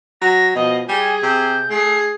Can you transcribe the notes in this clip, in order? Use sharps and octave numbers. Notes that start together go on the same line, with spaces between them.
F#3 A#6
B2 F3 D#5
G3 G#4 G#5
C3 G6
A3 G#4 C7